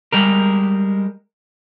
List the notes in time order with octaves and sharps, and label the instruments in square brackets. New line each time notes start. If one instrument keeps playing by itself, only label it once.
[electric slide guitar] G3 G#3 A#4